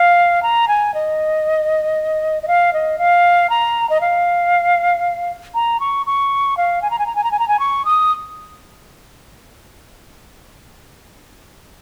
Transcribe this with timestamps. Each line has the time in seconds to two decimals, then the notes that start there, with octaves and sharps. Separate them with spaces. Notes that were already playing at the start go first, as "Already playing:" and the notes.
Already playing: F5
0.43 A#5
0.68 G#5
0.94 D#5
2.43 D#5
2.48 F5
2.73 D#5
2.99 F5
3.50 A#5
3.90 D#5
4.01 F5
5.55 A#5
5.80 C#6
6.06 C#6
6.57 F5
6.82 G#5
6.91 A#5
6.99 G#5
7.07 A#5
7.16 G#5
7.24 A#5
7.32 G#5
7.39 A#5
7.48 G#5
7.60 C#6
7.85 D#6